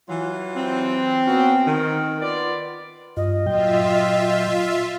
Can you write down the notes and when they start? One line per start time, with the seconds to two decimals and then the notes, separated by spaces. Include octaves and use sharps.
0.09 E3 F#3 F4
0.56 C4
1.27 B3 C#4 F#4
1.67 D#3
2.22 B3 F4 D5
3.17 G2 F4 D#5
3.46 A#2 F#3 F4 E5 G5